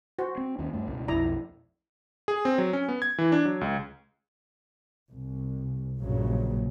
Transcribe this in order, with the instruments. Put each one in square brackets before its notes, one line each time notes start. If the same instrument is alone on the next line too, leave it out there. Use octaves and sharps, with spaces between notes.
[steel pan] F#4 C5
[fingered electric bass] C4
D#2 C#4
G2 A3
C#2 B2
[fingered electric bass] B1 F2 [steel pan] E4 D5 A#5
[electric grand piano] G#4
C4
F#3
C#4
B3
G#6
E3
D4
F#3
C#2
[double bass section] C2
A#1 G2 A#2 C#3 F#3